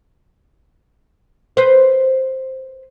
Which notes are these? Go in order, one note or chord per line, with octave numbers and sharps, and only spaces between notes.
B4 C5